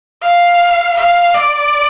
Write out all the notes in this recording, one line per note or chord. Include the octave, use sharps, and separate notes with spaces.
F5
F5
D5